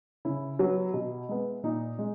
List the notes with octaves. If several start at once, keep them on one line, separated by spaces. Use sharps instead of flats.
C#3 E4
F#3 B3
B2
G#3 B3
A#2 D#4
G#3